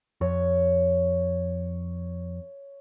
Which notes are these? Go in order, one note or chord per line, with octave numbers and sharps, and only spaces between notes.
F2 C#5